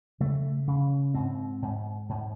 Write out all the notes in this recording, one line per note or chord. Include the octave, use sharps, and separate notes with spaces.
C#3 A3
C#3
G#2 C4
G#2
G#2